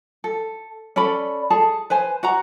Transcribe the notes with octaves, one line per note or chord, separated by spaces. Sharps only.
A4
C#4 A4 D5 B5
G#4 A4 A5
B4 C5 G#5
F#4 F#5 A#5